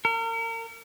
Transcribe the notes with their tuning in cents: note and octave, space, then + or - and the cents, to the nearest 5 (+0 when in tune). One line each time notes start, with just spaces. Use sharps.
A#4 -35